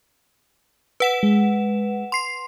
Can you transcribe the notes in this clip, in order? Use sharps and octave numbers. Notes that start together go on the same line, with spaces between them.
B4 F#5 E7
G#3
C6 C7